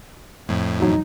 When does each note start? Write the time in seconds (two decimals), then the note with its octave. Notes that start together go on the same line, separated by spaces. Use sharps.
0.49 F2 A2
0.80 B1 E2 F#3 D#4